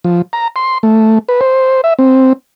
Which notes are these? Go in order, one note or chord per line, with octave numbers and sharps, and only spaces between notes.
F3
A#5
C6
A3
B4
C5
E5
C4